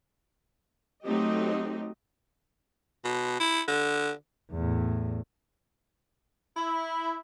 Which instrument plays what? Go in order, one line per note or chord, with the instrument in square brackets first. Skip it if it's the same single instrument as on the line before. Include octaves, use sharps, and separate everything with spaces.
[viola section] F#3 A3 C4 D#4 G4 D#5
[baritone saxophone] B2
E4
D3
[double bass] E2 A2
[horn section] E4